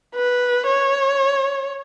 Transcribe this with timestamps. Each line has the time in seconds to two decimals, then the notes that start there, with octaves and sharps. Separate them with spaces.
0.15 B4
0.67 C#5